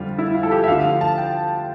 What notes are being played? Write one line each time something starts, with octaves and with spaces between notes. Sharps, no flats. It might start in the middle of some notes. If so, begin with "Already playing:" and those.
Already playing: F2 D3 G3 F4
E4
F4
A4
G4
E5
D2 D3 F3 F5
A5
G5